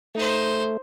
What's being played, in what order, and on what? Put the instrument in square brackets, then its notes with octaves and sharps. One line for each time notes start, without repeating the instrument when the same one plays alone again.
[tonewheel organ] A3 [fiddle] D#4 C5